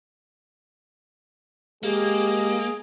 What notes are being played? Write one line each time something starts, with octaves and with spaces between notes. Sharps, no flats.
G#3 A#3 G4 G#4